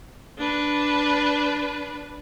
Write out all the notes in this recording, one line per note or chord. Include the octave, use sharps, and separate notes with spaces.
D4 B4